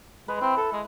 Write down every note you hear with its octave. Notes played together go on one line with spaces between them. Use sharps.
G#3 B4
C4 E4
A4
G#3